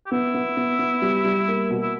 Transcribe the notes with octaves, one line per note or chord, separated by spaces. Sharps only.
G4
B3 E4
B3
B3
B3
G3
G3
A#3
B2
E4